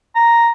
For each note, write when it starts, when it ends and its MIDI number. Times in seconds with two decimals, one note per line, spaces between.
0.15 0.50 82